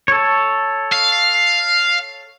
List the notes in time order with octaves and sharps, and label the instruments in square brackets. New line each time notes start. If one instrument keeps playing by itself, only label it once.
[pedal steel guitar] A4 C#5
[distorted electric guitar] F5